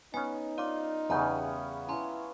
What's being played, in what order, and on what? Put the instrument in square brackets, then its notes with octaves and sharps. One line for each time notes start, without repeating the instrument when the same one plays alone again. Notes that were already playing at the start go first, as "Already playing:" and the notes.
[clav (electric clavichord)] B3 C#4 [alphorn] D#4 [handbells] G#5
[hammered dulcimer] F4 [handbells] D5 D6
[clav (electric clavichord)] E2 C#3 [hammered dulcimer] G3 B3 C#4 [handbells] A#5 G6
[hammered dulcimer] C#4 [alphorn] E4 [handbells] A#5 C6